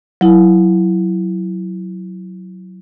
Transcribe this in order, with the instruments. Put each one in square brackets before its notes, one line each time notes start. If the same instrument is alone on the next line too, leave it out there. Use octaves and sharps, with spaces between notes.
[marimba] F#3 E4